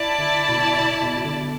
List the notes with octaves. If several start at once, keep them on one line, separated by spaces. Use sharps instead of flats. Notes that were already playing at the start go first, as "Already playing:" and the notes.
Already playing: E4 D5 A5
D3
B2
B2
B2
B2
D3